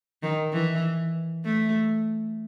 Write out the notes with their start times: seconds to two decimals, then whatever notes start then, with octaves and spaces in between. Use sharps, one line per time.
0.23 D#3
0.53 E3
1.45 A3